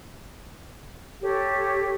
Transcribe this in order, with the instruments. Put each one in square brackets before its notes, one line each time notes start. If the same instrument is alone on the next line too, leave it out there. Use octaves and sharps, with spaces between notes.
[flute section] G4 A4 C#5